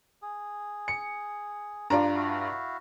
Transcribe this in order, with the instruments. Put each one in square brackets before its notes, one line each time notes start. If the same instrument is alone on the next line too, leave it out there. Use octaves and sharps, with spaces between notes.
[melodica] G#4
[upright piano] C#7
[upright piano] G2 [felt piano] F4 D5 A#5
[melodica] E4 F#4 F5